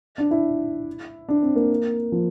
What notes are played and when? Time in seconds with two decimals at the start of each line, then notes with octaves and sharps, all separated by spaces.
0.18 D4
0.31 E4
1.29 D4
1.42 C4
1.56 A#3
2.12 F3